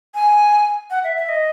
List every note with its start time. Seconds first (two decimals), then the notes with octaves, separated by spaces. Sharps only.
0.15 G#5
0.91 F#5
1.04 E5
1.17 E5
1.29 D#5